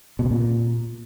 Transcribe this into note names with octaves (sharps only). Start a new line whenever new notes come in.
B2
C3
A#2